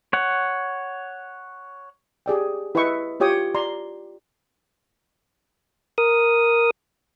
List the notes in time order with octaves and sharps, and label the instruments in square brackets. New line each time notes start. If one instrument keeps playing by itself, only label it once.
[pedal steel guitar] C#5 F#5
[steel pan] G4 G#4 D5 G5
E4 B4 D#5 E5 C#6
F4 G4 C#5 G5 D#6
D5 A#5 C6
[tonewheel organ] A#4 D#6